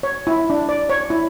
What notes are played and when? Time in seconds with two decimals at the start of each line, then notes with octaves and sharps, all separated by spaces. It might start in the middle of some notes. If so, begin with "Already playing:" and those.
0.03 C#5
0.27 E4
0.50 D4
0.69 D5
0.90 C#5
1.10 E4